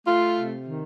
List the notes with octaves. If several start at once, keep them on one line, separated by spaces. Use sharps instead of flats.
A3 F4
C3
D#3